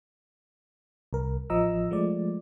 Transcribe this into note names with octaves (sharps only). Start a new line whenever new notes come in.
C2 A#4
A1 F3 D#5 A#5 E6
F3 G#3 A3 D5